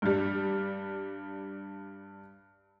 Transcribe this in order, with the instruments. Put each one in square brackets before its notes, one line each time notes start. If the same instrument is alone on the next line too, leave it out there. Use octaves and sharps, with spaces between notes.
[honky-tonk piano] G2 G3